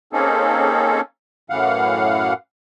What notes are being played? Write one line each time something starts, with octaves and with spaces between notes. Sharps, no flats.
A#3 C4 C#4 D#4 G#4 A4
F#2 A2 E3 F5 F#5